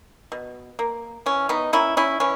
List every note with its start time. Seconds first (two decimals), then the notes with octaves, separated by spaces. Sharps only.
0.32 B2
0.79 A#3
1.26 E3 C#4
1.49 B3 D#4
1.73 A#3 C#4 E4
1.97 C#4 E4
2.20 E3 C#4